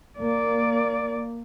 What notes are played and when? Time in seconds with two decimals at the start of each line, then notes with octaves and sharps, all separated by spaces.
0.19 A#3 D5